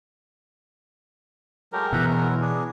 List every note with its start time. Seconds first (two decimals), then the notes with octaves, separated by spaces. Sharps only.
1.73 F#3 G#3 A3 G4 A#4
1.92 B2 E3 E5 F#5 A#5
2.12 E4 F#4
2.41 B3 D4 G#4